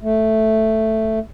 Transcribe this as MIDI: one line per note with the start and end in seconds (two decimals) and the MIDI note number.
0.01 1.19 57